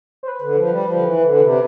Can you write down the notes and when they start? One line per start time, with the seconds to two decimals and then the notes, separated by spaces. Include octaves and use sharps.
0.23 C5
0.28 B4
0.42 D3
0.55 F3
0.69 G3
0.84 F3
0.94 D3
1.02 E3
1.21 D3
1.40 C3